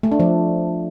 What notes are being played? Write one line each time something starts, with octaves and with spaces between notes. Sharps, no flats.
A3
D4
F3